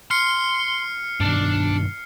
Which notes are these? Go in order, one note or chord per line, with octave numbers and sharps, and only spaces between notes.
C6 F6 C7 C#7
G2 B2 D#3 D4